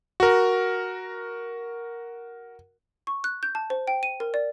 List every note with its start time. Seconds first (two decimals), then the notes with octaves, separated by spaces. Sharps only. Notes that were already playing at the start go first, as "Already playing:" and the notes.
0.20 F#4 A#4
3.07 C#6
3.24 F#6
3.43 G6
3.55 A5
3.70 C5
3.87 G5
4.03 D#7
4.20 A#4
4.34 D5